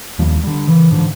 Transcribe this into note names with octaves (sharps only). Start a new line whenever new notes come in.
D#2 F3 G3
D3 G3
C#3 E3
G#2 D3 E3 F3